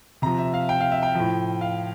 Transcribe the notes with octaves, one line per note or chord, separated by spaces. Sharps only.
C3 F3 A#5
E5
F5
G5
F5
E5
G5
A2 F3
F5